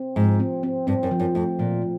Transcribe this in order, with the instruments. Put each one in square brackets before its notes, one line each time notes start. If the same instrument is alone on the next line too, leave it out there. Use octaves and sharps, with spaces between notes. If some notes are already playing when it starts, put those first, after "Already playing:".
Already playing: [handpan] C4
[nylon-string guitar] G#2 [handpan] F3
[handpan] C4
C4
[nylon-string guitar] G2 [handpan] C4
[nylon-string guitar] F#2
[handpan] F3
[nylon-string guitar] F#2
[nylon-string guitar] F2 [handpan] A3
[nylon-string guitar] A#2 [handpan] F3
[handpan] A#2